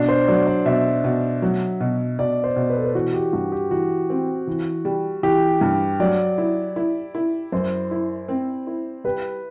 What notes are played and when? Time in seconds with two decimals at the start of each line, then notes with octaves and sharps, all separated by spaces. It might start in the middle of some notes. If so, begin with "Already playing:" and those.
Already playing: B2 D4
0.09 C5
0.28 F#3 D5
0.47 D5
0.65 B2 E5
1.04 B2
1.42 F#3
1.80 B2
2.19 B2 D5
2.44 C5
2.56 B2
2.69 B4
2.77 A4
2.84 B4
2.94 E3 F#4
3.14 G4
3.33 G2 F#4
3.52 G4
3.71 E3 F#4
4.10 C4
4.47 E3
4.85 G3
5.23 E3 G4
5.61 G2
6.00 F#3 D5
6.38 E4
6.76 E4
7.15 E4
7.52 F#2 C5
7.91 E4
8.28 C4
8.67 E4
9.04 G3 B4